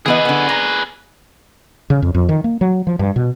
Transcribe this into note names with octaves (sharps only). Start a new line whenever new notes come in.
E3 B3 G#4 B4 D#5
D3 B3
A#5
C#3
F2
F2
D#3
A#3
F#3
F3
G2
B2